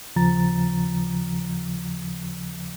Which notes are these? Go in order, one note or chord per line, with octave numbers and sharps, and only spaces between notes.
D#2 C#3 F3 A#5 A6